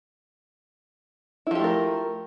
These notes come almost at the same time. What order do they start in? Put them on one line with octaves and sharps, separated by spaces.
E4 F3 G4 A3 A#4